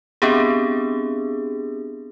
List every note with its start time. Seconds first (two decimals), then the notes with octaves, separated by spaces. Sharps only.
0.22 B3 C4 D4 G4 G#4